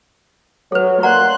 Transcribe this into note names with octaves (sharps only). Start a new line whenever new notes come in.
F#3 A4 B4 C#5
A#3 D5 F#5 A#5 C6 F#6